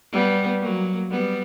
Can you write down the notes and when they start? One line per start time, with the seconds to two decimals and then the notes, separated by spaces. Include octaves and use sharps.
0.12 G3 B3
0.61 F#3 A#3
1.11 G3 B3